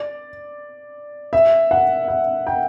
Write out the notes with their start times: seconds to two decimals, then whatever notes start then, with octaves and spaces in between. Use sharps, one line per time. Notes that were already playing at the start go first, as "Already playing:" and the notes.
Already playing: D5
1.33 E5
1.71 F#5
2.08 E5
2.47 G5